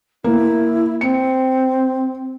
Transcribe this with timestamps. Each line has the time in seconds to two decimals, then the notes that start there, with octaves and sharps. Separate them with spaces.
0.24 A#3 E4
1.01 C4 C#7